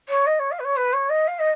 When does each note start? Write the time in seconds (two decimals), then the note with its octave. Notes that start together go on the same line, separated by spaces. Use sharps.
0.09 C#5
0.26 D#5
0.39 C#5
0.51 F5
0.59 B4
0.64 C#5
0.76 B4
0.93 C#5
1.09 D#5
1.27 F5
1.39 D#5